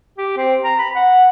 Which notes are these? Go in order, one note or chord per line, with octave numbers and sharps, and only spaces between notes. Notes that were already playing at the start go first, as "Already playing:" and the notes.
G4
C4
A#5
B5
F#5